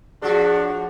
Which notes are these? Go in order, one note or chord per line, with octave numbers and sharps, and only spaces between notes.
A2 F3 D4 F#4 G#4